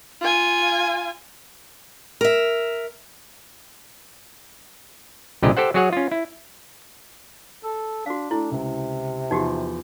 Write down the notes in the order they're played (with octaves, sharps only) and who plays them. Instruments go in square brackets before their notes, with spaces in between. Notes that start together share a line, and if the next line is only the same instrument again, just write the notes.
[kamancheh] F4 G#5
[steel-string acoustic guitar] A#4 E5
[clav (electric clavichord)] C2 A#2 D3 G4 G#4 D#5
G4 A4 C5 F#5
F#3 F#4 G#4 C#5 F#5
C#4 F4
E4
[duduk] A4
[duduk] D4 [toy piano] F#4 F5
[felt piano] A3 [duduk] D4 [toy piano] E4
[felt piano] C#2 [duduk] C3
[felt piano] E2 F3 [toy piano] D#4 F#4 G4